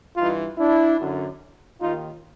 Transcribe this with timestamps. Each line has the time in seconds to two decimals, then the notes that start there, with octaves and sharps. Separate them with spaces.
0.17 G2 E3 D#4 F4
0.58 D4 E4
0.99 F#2 D3
1.80 D#2 D#3 D#4 F4